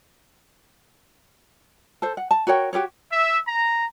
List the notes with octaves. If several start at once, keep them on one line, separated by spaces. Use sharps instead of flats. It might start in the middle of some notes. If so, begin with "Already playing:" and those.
A4 C5
F#5
A5
F#4 A#4 C#5 G5
F#4 G4 A#4 C#5
E5
A#5